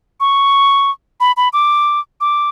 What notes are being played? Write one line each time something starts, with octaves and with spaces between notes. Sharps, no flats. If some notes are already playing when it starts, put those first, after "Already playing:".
C#6
B5
B5
D6
D6